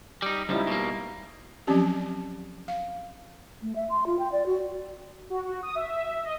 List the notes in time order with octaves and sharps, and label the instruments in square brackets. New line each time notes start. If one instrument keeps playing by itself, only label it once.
[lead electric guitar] G3 D#4
[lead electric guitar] C#2 F3 [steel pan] G3 D#4 E4
[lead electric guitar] B2 A#3
[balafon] F3 F#3 C4 C#4 G4
F5
[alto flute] A3
E5
C6
F4
G5
D5
F#4
[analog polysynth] F#4
F#4
D#6
E5
E5
D#5